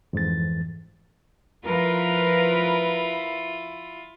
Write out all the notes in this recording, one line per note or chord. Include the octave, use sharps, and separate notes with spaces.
F2 G#2 E3 A6
F3 E4 F4 A#4 B4